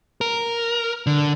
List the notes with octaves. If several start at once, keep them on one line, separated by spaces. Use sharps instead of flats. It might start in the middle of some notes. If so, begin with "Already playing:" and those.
A#4
D3